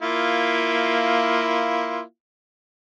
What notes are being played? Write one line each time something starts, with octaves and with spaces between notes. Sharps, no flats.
A#3 E4 F4